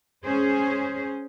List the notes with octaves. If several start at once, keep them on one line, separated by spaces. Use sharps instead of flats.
C#4 G#4 C5